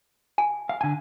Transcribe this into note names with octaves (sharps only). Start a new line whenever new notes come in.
G#5
F5
D3 G#5